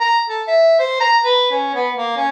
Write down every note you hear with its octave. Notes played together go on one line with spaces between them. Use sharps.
A#5
A4
E5
C5
A#5
B4
C#4
B3
A#3
C#4